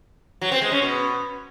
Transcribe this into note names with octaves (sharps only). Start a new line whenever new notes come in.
F#3
C4
G#3
C#4
B2